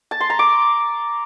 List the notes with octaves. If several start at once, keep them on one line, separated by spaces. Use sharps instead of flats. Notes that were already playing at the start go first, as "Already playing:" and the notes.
A5
C6
A#5
D6